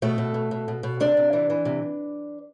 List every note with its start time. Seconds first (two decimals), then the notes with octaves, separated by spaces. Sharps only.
0.02 B2 A3 A4
0.18 B2
0.34 B2
0.51 B2
0.68 B2
0.83 B2
1.00 C3 D4 D5
1.17 C3
1.33 E3
1.50 E3
1.65 C3